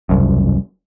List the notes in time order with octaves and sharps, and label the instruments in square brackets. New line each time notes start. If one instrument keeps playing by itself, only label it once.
[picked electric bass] E1 C2 F#2